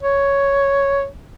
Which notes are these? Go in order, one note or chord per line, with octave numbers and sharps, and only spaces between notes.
C#5